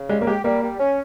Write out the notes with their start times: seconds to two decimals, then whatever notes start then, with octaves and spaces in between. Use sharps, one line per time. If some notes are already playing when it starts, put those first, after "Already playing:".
Already playing: C#3
0.09 G3 G#3
0.21 A#3
0.27 G#3 G4
0.44 G3 A#3
0.62 G3
0.79 C#4